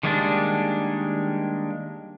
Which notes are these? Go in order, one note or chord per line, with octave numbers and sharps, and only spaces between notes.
D#3 G3 G#3 A#3 D4